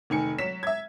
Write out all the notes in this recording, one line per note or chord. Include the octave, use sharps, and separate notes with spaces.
F1 D#3 G#5 C#7
F#3 B6 E7
E5 G#6